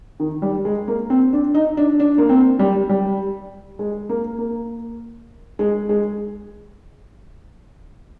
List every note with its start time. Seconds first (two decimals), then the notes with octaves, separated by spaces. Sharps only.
0.20 D#3
0.42 G3
0.65 G#3
0.88 A#3
1.10 C4
1.33 D4
1.55 D#4
1.77 D4
2.00 D4
2.18 A#3
2.29 C4
2.59 G3
2.89 G3
3.79 G#3
4.09 A#3
4.38 A#3
5.59 G#3
5.89 G#3